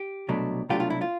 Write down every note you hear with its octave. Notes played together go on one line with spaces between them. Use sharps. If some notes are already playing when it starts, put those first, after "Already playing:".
Already playing: G4
C2 B2 F#3 A3 D4
C2 B2 F#3 A3 D4 F4 G4
F4
E4
F4